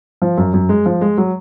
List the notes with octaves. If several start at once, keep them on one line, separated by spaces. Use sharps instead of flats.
F3
F#2
F#2
G#3
F3
G#3
F#3